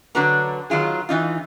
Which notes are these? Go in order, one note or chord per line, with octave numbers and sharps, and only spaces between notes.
D3 F#3 D4 F#4 B4 A#5
D#3 F#3 F4 G#4
E3 D#4 F4